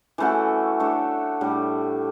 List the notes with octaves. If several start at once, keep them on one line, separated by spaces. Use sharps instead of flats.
E3 A3 C#4 F#4
A3 D4 A4 C#5
A2 G3 D4